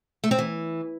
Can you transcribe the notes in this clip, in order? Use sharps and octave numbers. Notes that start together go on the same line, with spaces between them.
A3
C4
E3